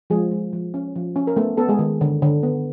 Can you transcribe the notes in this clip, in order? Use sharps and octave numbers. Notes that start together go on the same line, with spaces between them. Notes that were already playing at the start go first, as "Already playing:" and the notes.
F3 G#3 G#4
G#3
F3
C#4
F3
C#4
A#4
A3 B3 A4
B3 A4
G#3 G#4
D#3
D3
D3
B3